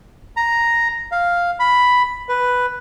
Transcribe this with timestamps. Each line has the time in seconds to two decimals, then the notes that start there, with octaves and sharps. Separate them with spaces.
0.37 A#5
1.12 F5
1.60 B5
2.29 B4